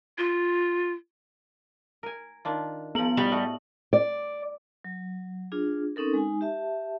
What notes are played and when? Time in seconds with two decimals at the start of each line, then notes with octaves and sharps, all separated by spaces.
0.18 F4
2.03 A#4 G#5
2.45 D#3 D4 F4
2.95 F3 B3 A#4 F#7
3.17 A2 G3 F#4 D#5
3.32 A3 F#4 D#5
3.93 D5
4.84 F#3
5.52 D4 F4 G#4
5.96 C4 C#4 D#4 A4 A#4
6.13 G#3 D#4 G#5
6.41 G4 E5 A5